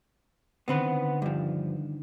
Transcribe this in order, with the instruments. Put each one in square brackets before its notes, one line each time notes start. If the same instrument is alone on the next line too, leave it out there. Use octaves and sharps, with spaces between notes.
[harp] D3 D#3 [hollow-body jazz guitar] B3 C4 B4
[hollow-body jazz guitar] G2 F3